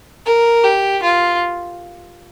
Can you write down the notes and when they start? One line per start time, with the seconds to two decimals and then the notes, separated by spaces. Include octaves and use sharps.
0.26 A#4
0.64 G4
1.03 F4